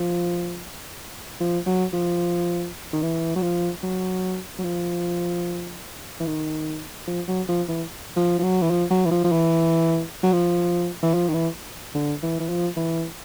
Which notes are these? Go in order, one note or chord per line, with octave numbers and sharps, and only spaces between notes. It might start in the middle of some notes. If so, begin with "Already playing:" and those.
Already playing: F3
F3
F#3
F3
D#3
E3
F#3
F3
F#3
F#3
F3
E3
D#3
F3
F#3
F3
E3
F3
F3
F#3
E3
F3
F#3
E3
F3
F3
E3
F#3
F3
E3
F3
D#3
E3
D3
E3
E3
F3
E3